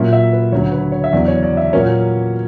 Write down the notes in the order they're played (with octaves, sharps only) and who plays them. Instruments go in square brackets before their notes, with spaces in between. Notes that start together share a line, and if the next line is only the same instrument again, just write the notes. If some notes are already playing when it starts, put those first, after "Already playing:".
Already playing: [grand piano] A#2 F#3 C#4 E5
E5
B4
D2 C#3 F#3 C#5
B4
C#5
E5
E2 C#3 F#3 D5
C#5
D5
E5
A#2 F#3 A#3 C#4 C#5